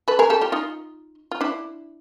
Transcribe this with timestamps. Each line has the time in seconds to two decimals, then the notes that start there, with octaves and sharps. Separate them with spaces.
0.08 A4 B4
0.19 G#4 A#4
0.30 G4 A4
0.41 F4 G4
0.52 D#4 F4
1.31 F4
1.41 D4 E4